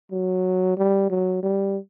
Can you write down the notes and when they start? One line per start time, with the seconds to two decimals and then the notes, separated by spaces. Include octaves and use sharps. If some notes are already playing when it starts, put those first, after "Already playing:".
0.12 F#3
0.77 G3
1.10 F#3
1.43 G3